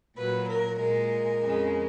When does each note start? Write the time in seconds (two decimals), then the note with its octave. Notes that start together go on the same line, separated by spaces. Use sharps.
0.16 A#2 F#3 B4
0.48 A#4
0.79 A#2 G#3 A#4
1.41 F2 C#3 G#3